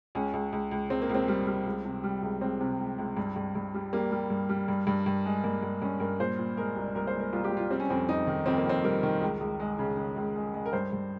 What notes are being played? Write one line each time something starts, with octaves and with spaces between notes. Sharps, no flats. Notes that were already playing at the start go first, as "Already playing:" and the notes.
C#2 C#4
C#2
C#2
C#2
C#2 C4
A#3
C#2
C4
G3
G3
C#2
C3
G3
C#2
C#2 C4
C3
C#2
C#2
G2
G2
G2
G3
G3 A#3
G3
G2
G3
G2
G2
G2
G#3
G2 A#3
G2
G2 C#4
G2 A#4
A#2 C5
A#2
G#3 A#4
C2
C2 A#4
C5
G#3
A#4
C2 F4
G4
C2
F4
G3 C4
C#4
F2 C4
F2 D#4
D#3
F2 C4
A#3
F2 C4
G3 A#4
D#3
C#2
C#2
G#3
C#3
C#3
C#2
G#3
G#3
A#4
G2 C5
G2